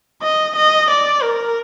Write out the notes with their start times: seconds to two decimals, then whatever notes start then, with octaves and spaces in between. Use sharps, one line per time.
0.23 D#5
0.56 D#5
0.90 D5
1.23 A#4